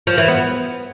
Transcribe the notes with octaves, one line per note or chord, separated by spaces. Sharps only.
F3
E3
B3